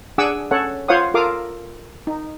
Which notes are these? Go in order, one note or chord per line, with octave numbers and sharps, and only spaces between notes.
D4 G#4 F#5 G#5 D6 E6
C#4 A4 C#5 F#5
F4 C5 C#5 F5 F#5 D#6
F4 A4 A#4 F5 D6 D#6
D#4